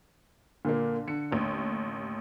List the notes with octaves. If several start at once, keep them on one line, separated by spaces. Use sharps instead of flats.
A#2 D3 A#3
D3 C#7
A1 D#2